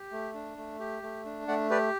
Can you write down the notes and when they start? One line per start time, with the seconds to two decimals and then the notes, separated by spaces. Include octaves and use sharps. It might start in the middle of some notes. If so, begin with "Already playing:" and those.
Already playing: G4
0.12 A3
0.34 D4
0.57 A3
0.80 G4
1.03 A3
1.25 D4
1.48 A3 D5 F#5
1.70 G4 B4 D5